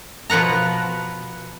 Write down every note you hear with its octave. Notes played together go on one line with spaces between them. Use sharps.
B2 F3 B3 F#5 A#5